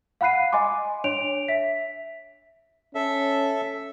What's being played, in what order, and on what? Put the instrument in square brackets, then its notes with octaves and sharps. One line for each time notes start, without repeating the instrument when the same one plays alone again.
[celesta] F5 F#5 B5 F#6 C7 D#7
D#5 G#5 C6 D6
D4 C#5 D7 F7
E5 B6
[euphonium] C#4 [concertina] A4 E5